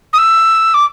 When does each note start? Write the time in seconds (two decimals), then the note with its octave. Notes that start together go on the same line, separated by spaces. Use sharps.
0.13 D#6
0.18 E6
0.74 D6